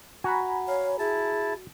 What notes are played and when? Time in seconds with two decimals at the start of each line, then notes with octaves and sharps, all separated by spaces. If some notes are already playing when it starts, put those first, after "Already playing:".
0.24 F#4 G#5 A#5 B5
0.68 C#5 F5
0.99 E4 G#4 A5